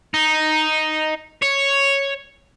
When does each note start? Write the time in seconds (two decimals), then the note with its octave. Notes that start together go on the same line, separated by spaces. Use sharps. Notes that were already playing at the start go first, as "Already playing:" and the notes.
0.14 D#4
1.43 C#5